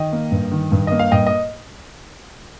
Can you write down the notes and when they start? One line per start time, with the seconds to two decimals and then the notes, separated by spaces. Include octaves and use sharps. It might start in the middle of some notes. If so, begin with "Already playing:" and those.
Already playing: D#3 D#5 G5
0.13 A#3
0.32 G2
0.52 D#3
0.72 G2
0.87 A#3 D#5
0.99 F5
1.11 G2 D#5 G5
1.26 D#5